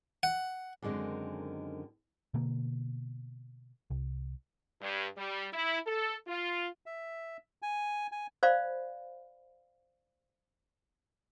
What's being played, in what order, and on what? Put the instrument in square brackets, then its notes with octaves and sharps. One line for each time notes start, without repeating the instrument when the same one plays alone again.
[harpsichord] F#5
[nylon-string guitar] F#2 D3 D#3 G#3 C4
[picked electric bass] B2 D3 A#3
C2
[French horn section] G2
G3
E4
A4
F4
[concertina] E5
G#5
G#5
[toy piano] C5 D5 F5 B5